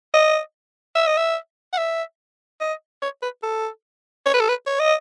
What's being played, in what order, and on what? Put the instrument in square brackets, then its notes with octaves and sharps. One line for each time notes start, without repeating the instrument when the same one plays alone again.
[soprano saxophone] D#5
E5
D#5
E5
F#5
E5
D#5
C#5
B4
A4
C#5
B4
A4
B4
C#5
D#5